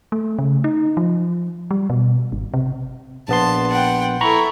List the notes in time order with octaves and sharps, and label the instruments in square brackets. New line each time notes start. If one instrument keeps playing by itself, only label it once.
[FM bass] A3
C#3
D#4
F3
G3
B2
G#1
C3
[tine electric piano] A#1 B3 C6 [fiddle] A5
[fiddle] F#5 G5
[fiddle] E4 A4 [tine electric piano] A#5 B5 C#6